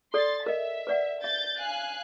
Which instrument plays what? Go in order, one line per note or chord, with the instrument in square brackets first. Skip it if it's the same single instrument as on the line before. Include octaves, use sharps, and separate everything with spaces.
[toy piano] A4 D5 [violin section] C6 A6
[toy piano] A#4 D#5 [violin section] E5
[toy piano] B4 D5 F#5
[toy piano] E5 [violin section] G6 A6
[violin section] F5 G#5 F#6